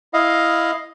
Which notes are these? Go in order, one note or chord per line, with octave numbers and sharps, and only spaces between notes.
E4 D#5 F5